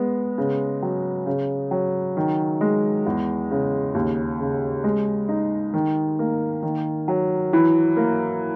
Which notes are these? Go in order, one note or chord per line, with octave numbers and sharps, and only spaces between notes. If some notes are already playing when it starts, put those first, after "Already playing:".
Already playing: G#3 B3
C#3
F#3
C#3
F#3
D#3
G#3
E2
C#3
D#2
C#3
G#3
D#4
D#3
A#3
D#3
F#3
E3
A#3